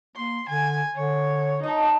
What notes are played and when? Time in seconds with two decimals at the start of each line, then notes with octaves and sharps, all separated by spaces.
0.16 A#3 C6
0.50 D3 G#5
0.95 D3 C#5
1.63 D#4 D#5 A5